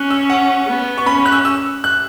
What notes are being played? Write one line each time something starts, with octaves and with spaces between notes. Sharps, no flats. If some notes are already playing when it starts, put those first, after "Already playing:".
Already playing: C#4 F#6
E6
F#5
B3
C#6
C#4 B5
F#6
E6
E6
F#6